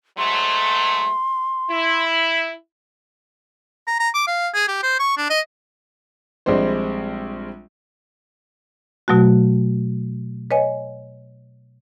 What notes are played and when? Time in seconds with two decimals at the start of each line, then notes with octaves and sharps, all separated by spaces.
0.18 G#2 F#3 A3 C6
1.70 E4
3.87 A#5
4.00 A#5
4.14 D6
4.27 F5
4.54 G#4
4.68 G4
4.83 C5
4.99 C#6
5.17 D4
5.30 D#5
6.46 A#1 G3 G#3 C4 C5
9.08 B2 F#3 A3 F#4
10.51 B4 C#5 D#5 G#5